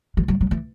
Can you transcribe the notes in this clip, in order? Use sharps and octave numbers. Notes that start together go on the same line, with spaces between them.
E3
F#3
F#3
E3